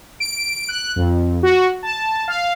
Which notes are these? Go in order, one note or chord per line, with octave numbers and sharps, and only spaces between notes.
D7
F#6
F2
F#4
A5
F5